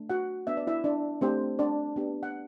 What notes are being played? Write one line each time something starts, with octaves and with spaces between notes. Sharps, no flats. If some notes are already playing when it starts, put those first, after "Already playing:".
Already playing: A3 D4
F#4 F#5
B3 D4 F#4 E5
D5
E4 E5
D4 D5
A3 C4 D4 G4 C5
D4 D5
B3 D4 G4
F#5